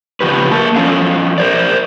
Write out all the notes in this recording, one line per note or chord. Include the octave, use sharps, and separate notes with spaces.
C#3 F3 G4 B4
A#3 A#4 A5
F3 C#4 A4 F5
A#4 C5 D5